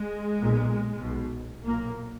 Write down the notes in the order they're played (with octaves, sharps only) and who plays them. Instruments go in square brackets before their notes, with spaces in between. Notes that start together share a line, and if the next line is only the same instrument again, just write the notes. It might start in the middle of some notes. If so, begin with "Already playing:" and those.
Already playing: [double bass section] G#3
B1 A#2
B1 B2
B1 A#2 A#3